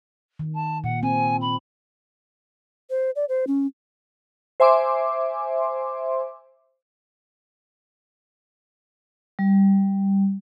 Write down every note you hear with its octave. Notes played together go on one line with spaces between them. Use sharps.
D#3
A5
A#2 F#5
C4 G#5
B5
C5
D5
C5
C#4
C5 E5 G#5 C6 D6
G3